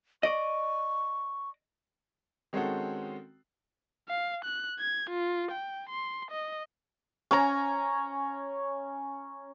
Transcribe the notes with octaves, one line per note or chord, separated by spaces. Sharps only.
D5 D#5 C#6
D#3 G#3 C4 C#4 F#4 A4
F5
F#6
G#6
F4
G5
C6
D#5
C#4 G#5 A#5